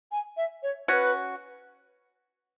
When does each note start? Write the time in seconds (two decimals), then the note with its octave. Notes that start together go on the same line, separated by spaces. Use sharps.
0.12 G#5
0.37 E5
0.63 C#5
0.88 C#4 F#4 C#5
0.93 B4